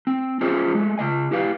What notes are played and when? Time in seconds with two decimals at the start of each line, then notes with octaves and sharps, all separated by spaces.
0.07 C4
0.41 C#4 F4 G#4 C5 D#5
0.75 G#3 A3
0.98 C#3 F3 D#5 G#5
1.31 E4 G4 B4 F5